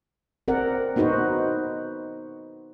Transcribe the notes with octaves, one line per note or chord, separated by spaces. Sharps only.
C4 A#4 D5 F#5
B3 D#4 F#4 B4 C5